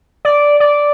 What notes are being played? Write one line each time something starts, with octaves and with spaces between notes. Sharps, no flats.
D5
D5